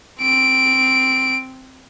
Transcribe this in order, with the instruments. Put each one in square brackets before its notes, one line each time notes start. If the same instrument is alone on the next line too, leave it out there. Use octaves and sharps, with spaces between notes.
[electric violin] C4 D7